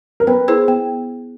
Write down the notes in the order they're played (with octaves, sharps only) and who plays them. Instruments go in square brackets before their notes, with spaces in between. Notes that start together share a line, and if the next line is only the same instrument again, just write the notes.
[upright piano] A#4
[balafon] B3 [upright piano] B4
[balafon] E4 G#4 C5
B3